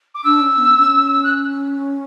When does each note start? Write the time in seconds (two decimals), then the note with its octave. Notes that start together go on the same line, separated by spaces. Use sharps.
0.14 D6
0.24 D4 E6
0.41 C#4
0.57 B3
0.74 C#4
1.23 F#6